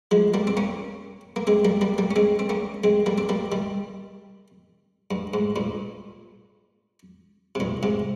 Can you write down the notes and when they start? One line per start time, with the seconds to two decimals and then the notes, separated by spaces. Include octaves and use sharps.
0.11 F3 G#3
0.34 G3 A#3
0.47 C4
0.57 A#3 C#4
1.36 A#3
1.47 G#3 C4
1.65 G3 A#3
1.81 G3 A#3
1.98 G3 A#3
2.11 C#4
2.16 G#3 C4
2.39 C4
2.49 A#3 C#4
2.84 G#3 C4
3.06 G3 A#3
3.18 C4
3.29 G3 A#3
3.52 D#3 G3
5.11 G2
5.34 G#2
5.56 G2 A#2
7.55 C3
7.60 G2 A#2
7.83 G#2 C3